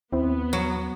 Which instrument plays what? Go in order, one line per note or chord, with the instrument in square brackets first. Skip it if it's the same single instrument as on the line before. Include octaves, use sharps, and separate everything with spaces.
[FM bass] D#2 [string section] B3 [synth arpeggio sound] C4 E4 C5
[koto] F#3